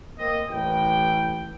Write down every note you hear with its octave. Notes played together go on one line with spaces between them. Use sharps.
A#3 C4 D#5
A1 B4 G5